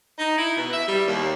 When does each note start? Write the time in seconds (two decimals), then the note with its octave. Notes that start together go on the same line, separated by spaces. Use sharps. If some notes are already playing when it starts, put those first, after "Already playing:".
0.19 D#4
0.38 E4
0.57 B2
0.73 E5
0.88 G3
1.07 D#2